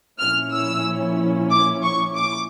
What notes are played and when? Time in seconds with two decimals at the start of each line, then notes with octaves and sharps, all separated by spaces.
0.19 A#2 F3 C#4 E4 F6
0.52 E6
1.50 D6
1.83 C#6
2.15 D6